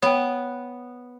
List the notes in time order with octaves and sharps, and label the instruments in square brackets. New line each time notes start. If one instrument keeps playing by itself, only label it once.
[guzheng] B3 [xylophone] C#5 G5